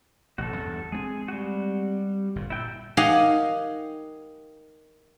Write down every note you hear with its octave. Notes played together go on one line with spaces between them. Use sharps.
A1 C3 F#4 A4
E2 G2
G#3 A#3 C4 G#4
G3 F#4
G1 A#2
A#2 E4 G5 E6
D#4 G4 A#4 F5 F#5 G#5